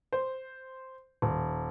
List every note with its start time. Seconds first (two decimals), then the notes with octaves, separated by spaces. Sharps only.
0.13 C5
1.22 D#1